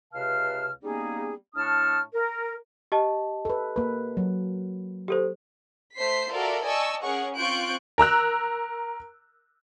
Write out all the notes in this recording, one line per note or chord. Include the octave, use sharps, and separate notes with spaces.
C#2 C3 B4 F5 A5 F6
G3 A#3 B3 C#4 D#4 G#4
A2 D4 A5 C#6 D#6 F6
A#4
G4 D#5 A5
A4 B4
A#3 B4
F#3
G4 A4 C5
A3 C5 B6 C7
F4 F#4 A4 A#4 D5 E5
D5 D#5 G#5 A5 C#6 E6
C#4 G#4 A#4 C#5 F#5 C#6
C4 F4 C#6 F#6 G6 D7
A#4 A#5 E6 F#6